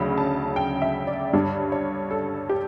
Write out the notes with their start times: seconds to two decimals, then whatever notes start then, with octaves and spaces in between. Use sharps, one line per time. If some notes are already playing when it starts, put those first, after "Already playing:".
Already playing: D2 C#3 F#3 C#4 B5
0.18 A5
0.56 G5
0.82 E5
1.07 D5
1.33 G2 D3 G3 D4 C#5
1.72 C#5
2.11 A4
2.49 G4